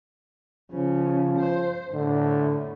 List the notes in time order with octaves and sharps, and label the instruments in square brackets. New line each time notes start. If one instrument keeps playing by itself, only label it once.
[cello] C#3 [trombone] F3
[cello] C5
[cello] A2 [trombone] D3